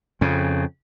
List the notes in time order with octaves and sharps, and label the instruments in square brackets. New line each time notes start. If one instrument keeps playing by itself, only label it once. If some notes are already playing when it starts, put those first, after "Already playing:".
[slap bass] F2 C#3